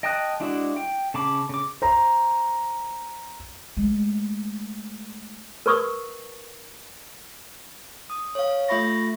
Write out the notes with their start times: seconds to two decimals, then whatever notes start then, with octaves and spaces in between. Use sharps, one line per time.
0.03 D#5 G5 A5 D#6 F#6
0.40 G#3 D4 E4 F#4
0.77 G5
1.14 C#3 A5 B5 D6
1.49 C#3 D6
1.82 C5 A#5
3.77 G#3 A3
5.66 A#4 B4 C#6 D#6
8.10 D#6
8.35 C#5 F5
8.68 A3 F4 E5 B5 C#6 A#6